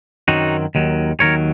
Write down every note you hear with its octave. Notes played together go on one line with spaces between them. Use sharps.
F#2 D#3 F#3 C4 D#4 F#4
D#2 D#3 F#3
D#2 D#3 F#3 A#4 C#5